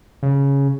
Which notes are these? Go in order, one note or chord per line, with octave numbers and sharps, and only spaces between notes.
C#3